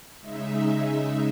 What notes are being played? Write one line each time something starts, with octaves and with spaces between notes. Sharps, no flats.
C#3 G#3 D#4 E5